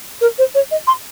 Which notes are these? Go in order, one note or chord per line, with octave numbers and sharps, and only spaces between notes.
A#4
C5
C#5
D#5
C6